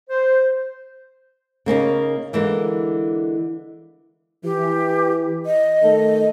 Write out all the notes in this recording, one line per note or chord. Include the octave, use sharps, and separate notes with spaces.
C5
C#3 A#3 C#4 D#4
D3 E3 G#3 A#3
E3 G4
D#5
D#3 A3 A4